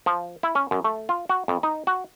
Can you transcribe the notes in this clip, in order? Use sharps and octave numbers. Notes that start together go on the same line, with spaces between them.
F3
E4
C#4
F#2
A3
F4
F#4
F2
D#4
F#4